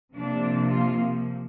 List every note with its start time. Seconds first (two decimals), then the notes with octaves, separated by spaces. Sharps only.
0.14 C3 F3 A#3 D4
0.71 F4